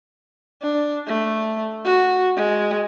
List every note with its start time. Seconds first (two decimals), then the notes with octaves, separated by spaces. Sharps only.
0.62 D4
1.07 A3
1.85 F#4
2.36 G#3